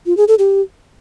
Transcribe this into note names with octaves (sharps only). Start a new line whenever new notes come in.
F4
G#4
A4
G4